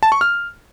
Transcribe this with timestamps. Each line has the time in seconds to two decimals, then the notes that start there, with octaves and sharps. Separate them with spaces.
0.03 A5
0.12 C#6
0.21 F6